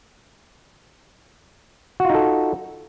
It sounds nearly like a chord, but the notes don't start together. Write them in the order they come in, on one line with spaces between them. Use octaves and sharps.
F#4 F4 D#4 A4